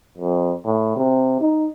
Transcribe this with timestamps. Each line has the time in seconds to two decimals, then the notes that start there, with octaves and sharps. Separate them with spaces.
0.18 F2
0.65 A2
0.96 C3
1.41 D#4